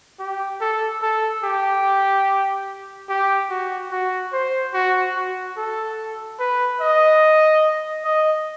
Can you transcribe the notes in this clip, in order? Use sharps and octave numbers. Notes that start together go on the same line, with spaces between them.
G4
A4
A4
G4
G4
F#4
F#4
C5
F#4
F#4
A4
B4
D#5
D#5